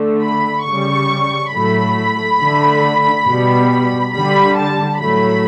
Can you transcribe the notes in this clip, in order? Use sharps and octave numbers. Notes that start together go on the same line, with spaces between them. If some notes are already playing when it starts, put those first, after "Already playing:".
Already playing: D3 A3
B5
C#3 G3 C#6
A2 F#3 A3 B5
D3 A3
B2 G3
D3 G3 B5
A5
A2 F#3 A3 B5